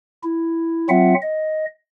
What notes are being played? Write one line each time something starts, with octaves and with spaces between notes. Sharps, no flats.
E4
F#3 C4 F4 E5 F#5
D#5